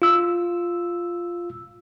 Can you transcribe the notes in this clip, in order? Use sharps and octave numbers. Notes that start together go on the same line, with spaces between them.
F4 E6